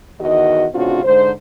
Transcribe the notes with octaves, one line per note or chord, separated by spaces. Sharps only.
E2 D#3 F#4 D#5
A2 C#3 C4 D4 F4 F#4
G#2 D3 G#3 C5